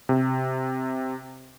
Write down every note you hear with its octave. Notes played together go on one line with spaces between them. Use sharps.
C3